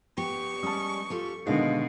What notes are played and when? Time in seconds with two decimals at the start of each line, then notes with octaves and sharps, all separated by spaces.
0.18 B3 G4 C#6
0.63 G3 G#3 C#4 A5 D#6
1.10 F4 G4 A4
1.47 B2 D3 D#3 G#3 F5